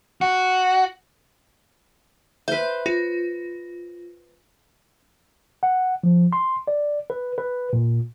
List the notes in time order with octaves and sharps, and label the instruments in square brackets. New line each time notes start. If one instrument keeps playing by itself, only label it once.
[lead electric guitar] F#4
[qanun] B4 C5 [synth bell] E5
[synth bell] F4
[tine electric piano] F#5
F3
C6
D5
B4
B4
A#2